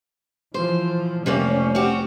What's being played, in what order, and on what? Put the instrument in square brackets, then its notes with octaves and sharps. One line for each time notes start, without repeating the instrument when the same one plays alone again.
[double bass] E3 F3 [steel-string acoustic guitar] C5
[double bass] F1 C#4 [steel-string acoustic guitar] C3 G3 A#3
[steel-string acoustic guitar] C4 F#4 G4